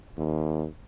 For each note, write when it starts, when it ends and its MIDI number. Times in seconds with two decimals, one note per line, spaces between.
0.17 0.66 39